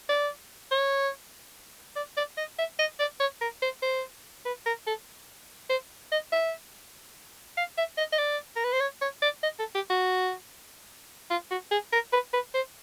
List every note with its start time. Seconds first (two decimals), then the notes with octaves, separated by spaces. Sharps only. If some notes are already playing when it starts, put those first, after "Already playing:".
0.09 D5
0.71 C#5
1.96 D5
2.17 D5
2.37 D#5
2.59 E5
2.79 D#5
2.99 D5
3.20 C#5
3.41 A#4
3.62 C5
3.83 C5
4.45 B4
4.66 A#4
4.87 A4
5.70 C5
6.12 D#5
6.32 E5
7.57 F5
7.77 E5
7.97 D#5
8.12 D#5
8.18 D5
8.56 A#4
8.64 B4
8.73 C5
8.81 C#5
9.02 C#5
9.22 D5
9.43 D#5
9.59 A4
9.75 G4
9.90 F#4
11.30 F4
11.51 F#4
11.71 G#4
11.92 A#4
12.13 B4
12.33 B4
12.54 C5